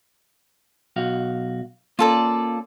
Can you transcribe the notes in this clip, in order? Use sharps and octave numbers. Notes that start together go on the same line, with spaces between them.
B1 F#4 F5
A#3 C#4 F4 A4 D5